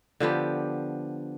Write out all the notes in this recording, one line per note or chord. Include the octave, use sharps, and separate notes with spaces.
D3 F3 B3 G4